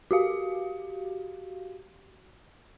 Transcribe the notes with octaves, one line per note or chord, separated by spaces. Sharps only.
F#4 G4 F5